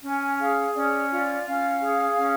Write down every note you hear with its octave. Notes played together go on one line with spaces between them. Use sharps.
C#4 G#5
G#4 F5
C#4 D5
F4 D5
C#4 F5
G#4
C#4